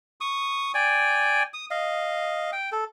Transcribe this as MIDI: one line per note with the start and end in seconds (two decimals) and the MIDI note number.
0.21 0.72 85
0.21 0.72 87
0.74 1.43 74
0.74 1.43 79
0.74 1.43 80
1.54 1.66 87
1.71 2.51 75
1.71 2.51 77
2.53 2.70 79
2.72 2.84 69